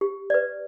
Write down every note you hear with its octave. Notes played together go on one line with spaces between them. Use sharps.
G4
B4 D5